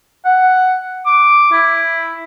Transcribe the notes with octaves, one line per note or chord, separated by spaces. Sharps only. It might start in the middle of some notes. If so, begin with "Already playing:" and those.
F#5
D6
E4